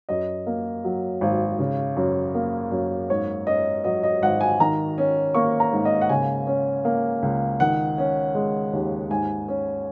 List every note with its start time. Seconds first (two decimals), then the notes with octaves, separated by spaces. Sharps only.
0.09 F#2 D#5
0.47 A#3
0.84 F#3
1.21 G#1
1.59 C#3
1.97 F#2
2.35 A#3
2.71 F#2
3.10 G#2 C#5
3.47 C#4 D#5
3.84 F#3 D#5
4.03 D#5
4.22 G#1 F#5
4.41 G#5
4.60 D#3 A#5
4.98 C#4
5.34 A#3 C#6
5.60 A#5
5.73 G#2
5.85 D#5
6.01 F#5
6.09 C#3 G#5
6.47 C#4
6.85 A#3
7.22 C#2
7.60 D#3 F#5
7.98 C#4
8.35 G#3
8.73 D#2
9.10 G#2 G#5
9.48 C#4